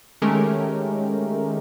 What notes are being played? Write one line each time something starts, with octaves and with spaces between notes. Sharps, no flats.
D#3 G#3 A3 C#4 G4 A#4